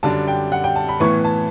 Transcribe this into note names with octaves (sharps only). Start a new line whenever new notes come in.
F#2 D3 G3 D4 A5
G5
F#5
G5
A5
B5
A2 E3 B3 C#6
A5